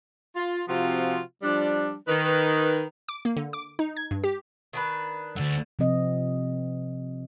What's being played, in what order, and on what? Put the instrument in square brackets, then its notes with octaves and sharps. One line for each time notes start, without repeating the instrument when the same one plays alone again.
[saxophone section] F4
C3 F3 C4 F4 F#4
F3 G3 D4
D#3 B4
[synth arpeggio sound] D6
A#3
D3
D6
D#4
G#6
G2
G4
[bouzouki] D#3 D4 B4
[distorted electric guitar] D2 G2 [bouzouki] D3
[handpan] C3 F3 C4 D#5